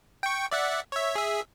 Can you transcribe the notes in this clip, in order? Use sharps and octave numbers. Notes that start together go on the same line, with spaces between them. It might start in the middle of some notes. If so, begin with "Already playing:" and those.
G5 C#6
D5 E5 F#5
C#5 E5
G#4 E5